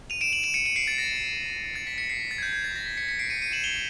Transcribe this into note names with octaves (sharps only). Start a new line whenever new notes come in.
D#7 F7
D7 E7
E7 F#7
D7 E7
C#7 D#7
C#7 D#7
C7 D7
A6
A#6
A6
B6
B6 C#7
C7
B6
A6
G#6
G6
G#6
A6
A#6
B6
B6 C#7
B6 C#7
C7 D7
C#7 D#7
C#7 D#7
E7 F#7
F7 G7